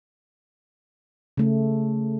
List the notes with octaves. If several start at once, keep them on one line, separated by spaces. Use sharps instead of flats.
C#3 A3